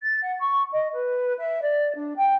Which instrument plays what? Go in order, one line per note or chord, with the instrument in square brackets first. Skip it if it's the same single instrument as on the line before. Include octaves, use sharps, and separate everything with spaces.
[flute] A6
F#5
C#6
D#5
B4
E5
D5
D4
G5